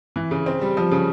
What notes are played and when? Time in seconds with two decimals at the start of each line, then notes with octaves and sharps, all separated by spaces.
0.16 E3
0.31 C#3
0.46 C4
0.61 G3
0.77 F3
0.91 C#3